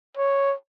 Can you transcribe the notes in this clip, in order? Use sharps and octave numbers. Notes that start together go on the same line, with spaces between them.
C#5